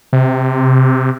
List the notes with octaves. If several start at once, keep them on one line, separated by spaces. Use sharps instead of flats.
C3